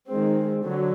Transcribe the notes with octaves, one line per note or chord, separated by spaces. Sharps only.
D#3 G#3 C4
D3 F#3